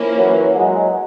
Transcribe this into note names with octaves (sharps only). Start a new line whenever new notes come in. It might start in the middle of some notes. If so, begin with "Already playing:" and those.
Already playing: F3 A#3 C#4 E4
E3 F#3
F#3 G#3